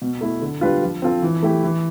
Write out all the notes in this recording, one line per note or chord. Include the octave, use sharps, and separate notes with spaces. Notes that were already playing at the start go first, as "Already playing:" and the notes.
B2
A3 E4
D3
G3 D4 F4 B4
F3
C4 F4 A4
E3
A3 E4 G4
E3